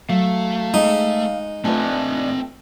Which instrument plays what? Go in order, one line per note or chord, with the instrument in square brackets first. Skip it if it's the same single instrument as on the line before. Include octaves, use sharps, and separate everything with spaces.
[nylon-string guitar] F#3 [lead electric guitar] A3 [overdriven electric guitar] F5
[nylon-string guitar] G#3 [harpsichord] D#4
[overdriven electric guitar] A#2 D4 [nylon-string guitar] A3 F4 B4 [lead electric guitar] C4 G#5